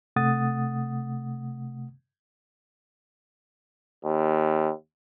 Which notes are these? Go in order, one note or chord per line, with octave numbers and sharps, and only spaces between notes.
C3 A3 F#5 D#6 A6
D#2